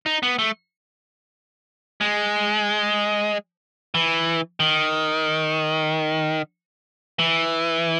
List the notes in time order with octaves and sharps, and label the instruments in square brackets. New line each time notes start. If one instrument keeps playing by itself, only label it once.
[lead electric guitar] D#4
B3
A3
G#3
E3
D#3
E3